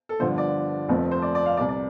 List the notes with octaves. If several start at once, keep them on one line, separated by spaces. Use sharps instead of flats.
A4
G1 G2 D3 F3 C5
D5
F1 F2 F3 A3 C4
C5
D5
D5
F5
C2 C3 G3 D5
D5